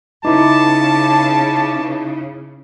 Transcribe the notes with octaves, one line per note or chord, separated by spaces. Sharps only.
C#3 C#4 D#4 E4 B4 A5 D6